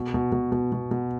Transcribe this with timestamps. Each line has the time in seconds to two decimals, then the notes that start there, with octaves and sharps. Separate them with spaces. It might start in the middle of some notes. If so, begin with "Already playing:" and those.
Already playing: B2
0.14 B2
0.32 B2
0.52 B2
0.72 B2
0.91 B2